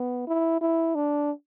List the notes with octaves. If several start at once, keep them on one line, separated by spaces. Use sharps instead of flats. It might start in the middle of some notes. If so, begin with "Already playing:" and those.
Already playing: B3
E4
E4
D4